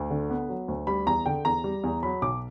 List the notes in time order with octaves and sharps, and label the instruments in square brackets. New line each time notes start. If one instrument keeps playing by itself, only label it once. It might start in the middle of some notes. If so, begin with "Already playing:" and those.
Already playing: [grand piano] D2
D3
B3
F#3
D2
G3 B5
E2 A#5
D3 G5
E2 A#5
G3
E2
F#3 B5
B1 D6